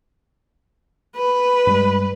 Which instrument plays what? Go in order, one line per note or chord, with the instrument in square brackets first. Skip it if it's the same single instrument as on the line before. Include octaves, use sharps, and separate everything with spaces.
[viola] B4
[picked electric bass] G2 G3 G#3